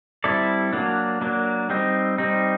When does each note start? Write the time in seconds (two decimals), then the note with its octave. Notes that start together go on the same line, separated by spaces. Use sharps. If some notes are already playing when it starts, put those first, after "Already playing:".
0.24 G3 C4 E4 A4 D5
0.73 F#3 A#3 D4
1.21 F#3 A#3 D4
1.70 G3 C4 D#4
2.18 G3 C4 D#4